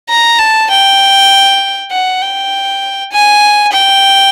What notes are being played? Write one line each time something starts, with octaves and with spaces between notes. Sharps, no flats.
A#5
A5
G5
F#5
G5
G#5
G5